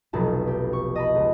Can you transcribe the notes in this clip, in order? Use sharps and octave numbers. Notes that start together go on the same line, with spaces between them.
F1 B1 B2 A5
G4
C#6
D#5 A5 B5
C#2